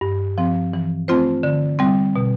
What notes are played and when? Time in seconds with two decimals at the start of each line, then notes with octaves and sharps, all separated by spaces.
0.01 G2
0.38 F3 C4
0.73 E3
1.08 A3 C4 F4 C5
1.43 D3
1.79 G3 C4
2.16 B2